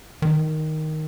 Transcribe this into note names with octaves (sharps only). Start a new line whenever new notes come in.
D#3